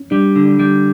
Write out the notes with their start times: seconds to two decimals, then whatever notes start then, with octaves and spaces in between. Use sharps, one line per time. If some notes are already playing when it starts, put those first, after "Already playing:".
Already playing: C#4
0.11 G3 D4
0.36 D3
0.59 G3